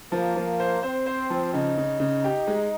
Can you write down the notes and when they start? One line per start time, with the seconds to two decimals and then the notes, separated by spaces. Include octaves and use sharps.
0.12 F3 A#3
0.36 F3
0.60 C5
0.83 C4 C5
1.06 C5
1.30 F3
1.54 C#3 D#4
1.77 C#3
2.00 C#3
2.24 G4
2.47 G#3